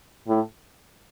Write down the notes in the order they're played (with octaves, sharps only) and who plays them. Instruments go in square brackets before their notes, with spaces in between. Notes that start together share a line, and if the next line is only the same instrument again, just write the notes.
[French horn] A2